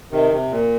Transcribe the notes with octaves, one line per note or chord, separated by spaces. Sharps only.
C3 D#3
C3
A#2